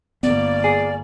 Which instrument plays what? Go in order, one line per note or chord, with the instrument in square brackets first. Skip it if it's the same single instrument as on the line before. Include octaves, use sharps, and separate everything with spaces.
[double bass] G1 A#3 [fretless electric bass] B3 [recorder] D5
[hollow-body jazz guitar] G#4